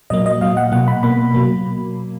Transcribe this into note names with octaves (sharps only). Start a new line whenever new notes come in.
A#2 F#3 A#3 D#5
D#5
A#2 F#3 A#3 F5
F#5
B2 F#3 A#3 F#5
B5
B2 A#3 B5
B2 F#3 A#3